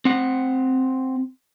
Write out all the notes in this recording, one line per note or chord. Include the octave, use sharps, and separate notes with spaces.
C4 F#5